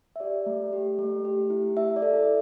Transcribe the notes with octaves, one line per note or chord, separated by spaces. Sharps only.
E5
G4 D5
A3
G4
A3
G4
E4
E4 E5
D5
A4
E5